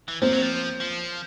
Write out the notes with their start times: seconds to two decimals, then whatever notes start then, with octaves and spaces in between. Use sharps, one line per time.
0.08 E3
0.22 F3 A#3 C4
0.33 F#3
0.42 F3
0.80 F3